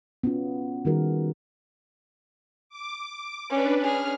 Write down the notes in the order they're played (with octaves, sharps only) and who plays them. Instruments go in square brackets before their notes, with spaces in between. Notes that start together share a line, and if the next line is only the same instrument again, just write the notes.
[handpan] B3 C#4 F4
D#3 G3 D#4 F#4 G#4 A#4
[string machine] D6
[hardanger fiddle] C#4 [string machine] D4 B4
[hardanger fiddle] C#4 G#4 [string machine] F6